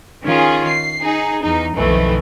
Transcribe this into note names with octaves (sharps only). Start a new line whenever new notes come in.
D#3 C#4 F4 G#4
C7
D#4 G#4
E2 D#4
B1 F2 D#3 E3 A3